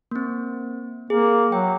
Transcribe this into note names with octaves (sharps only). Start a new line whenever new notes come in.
A#3 C4
A#3 G#4
F#3 G5